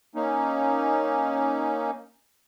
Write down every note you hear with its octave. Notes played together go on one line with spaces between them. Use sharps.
A#3 C#4 D#4